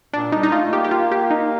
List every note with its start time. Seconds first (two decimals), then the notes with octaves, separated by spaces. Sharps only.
0.13 A#2 D4
0.32 G3 D#4
0.43 D#4
0.52 A3 F4
0.65 A3
0.72 A#3 G4
0.84 G4
0.91 F4
1.11 G4
1.30 D#4